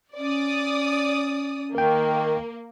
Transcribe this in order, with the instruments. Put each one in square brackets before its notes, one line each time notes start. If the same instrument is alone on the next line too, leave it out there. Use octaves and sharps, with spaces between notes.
[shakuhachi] C#4 [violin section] D5 D#6
[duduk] D#3 [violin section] A#3 [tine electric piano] A#4 G5